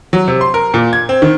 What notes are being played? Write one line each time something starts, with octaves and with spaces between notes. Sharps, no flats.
F#3
C3
C6
A#4
A#2
G#6
C4
D#3